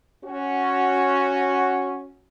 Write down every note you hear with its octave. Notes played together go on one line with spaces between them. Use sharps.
C#4 F#4